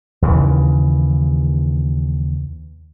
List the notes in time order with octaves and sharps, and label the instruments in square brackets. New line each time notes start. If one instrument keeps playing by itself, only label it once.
[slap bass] D#2 C#3 E3